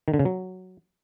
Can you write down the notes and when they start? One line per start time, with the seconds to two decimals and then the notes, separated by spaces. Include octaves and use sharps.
0.08 D#3
0.14 D3
0.19 C#3
0.25 F#3